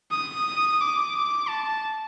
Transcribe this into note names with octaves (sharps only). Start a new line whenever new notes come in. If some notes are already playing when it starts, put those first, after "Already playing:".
D#6
D6
A5